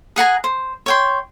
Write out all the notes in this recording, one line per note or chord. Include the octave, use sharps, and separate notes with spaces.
G#4 F#5 G#5 A#5
C5
C#5 G5 C6